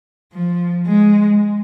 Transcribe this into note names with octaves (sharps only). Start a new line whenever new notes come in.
F3
G#3